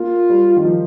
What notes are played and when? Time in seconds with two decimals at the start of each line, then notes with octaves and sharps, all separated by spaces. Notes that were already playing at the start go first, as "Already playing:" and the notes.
Already playing: A#3 F4
0.30 G3
0.57 D#3
0.65 F3